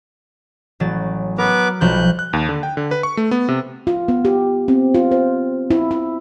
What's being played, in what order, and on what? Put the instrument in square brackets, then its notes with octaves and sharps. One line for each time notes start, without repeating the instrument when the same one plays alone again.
[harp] A1 F#3 A6
[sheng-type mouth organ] B3 B4 D6 [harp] A#4
[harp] B1 F3 G3 [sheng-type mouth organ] F#6 G6
[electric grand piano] F#6
D#2
D3
G5
D3
B4
C#6
A3
B3
C3
[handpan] F4
B3
G4
C4
F4
C5
E4
E4